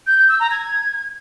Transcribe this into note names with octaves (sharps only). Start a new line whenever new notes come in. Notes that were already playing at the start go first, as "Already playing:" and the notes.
G6
G6
E6
A#5
G#6